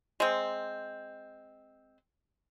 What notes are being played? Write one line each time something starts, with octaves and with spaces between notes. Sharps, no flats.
G#3 C4